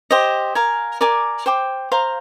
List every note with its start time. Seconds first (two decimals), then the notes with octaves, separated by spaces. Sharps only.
0.11 G4 C5 D#5
0.55 A#4 F5 G#5
1.01 A#4 D5 G#5 D6
1.46 C5 G5 D6
1.92 C5 F5 A#5